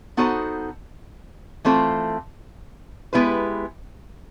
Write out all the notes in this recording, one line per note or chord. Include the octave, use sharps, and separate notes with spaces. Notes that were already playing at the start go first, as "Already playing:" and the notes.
B3 D#4 F#4 A4 C5
E3 A3 C4 F4 A4
G#3 B3 E4 G4 B4